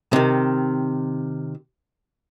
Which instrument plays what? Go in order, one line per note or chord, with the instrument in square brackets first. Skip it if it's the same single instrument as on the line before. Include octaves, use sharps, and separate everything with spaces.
[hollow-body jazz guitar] C3 D#3